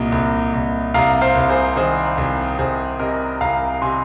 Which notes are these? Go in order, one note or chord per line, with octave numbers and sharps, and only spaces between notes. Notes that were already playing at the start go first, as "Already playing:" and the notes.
Already playing: C2 A#2 D#5
C2
C2
C2 F5 A#5
C5 F5
C2
G#4 C5
D#3 G#4 C5
C2
C2 G#4 C5
C3 A#4 D#5
C2 F5 A#5
C3 G#5 C6